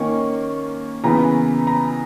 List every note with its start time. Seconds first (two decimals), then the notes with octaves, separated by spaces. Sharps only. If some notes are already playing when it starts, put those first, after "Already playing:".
Already playing: D#3 A#3 C#4 C#6
1.04 C#3 E3 B3 A#5
1.67 A#5